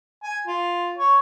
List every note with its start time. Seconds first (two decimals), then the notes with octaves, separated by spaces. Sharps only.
0.23 G#5
0.47 F4
0.98 C#5